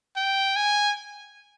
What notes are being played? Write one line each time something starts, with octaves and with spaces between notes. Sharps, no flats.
G5
G#5